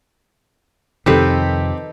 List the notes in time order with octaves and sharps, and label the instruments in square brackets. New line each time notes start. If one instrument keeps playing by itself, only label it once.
[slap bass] F2 C3 D#3 [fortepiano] C4 G4 [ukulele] D#4 A4 B4